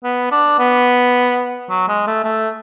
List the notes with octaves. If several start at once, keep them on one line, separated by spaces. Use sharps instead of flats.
B3
D4
B3
F#3
G#3
A3
A3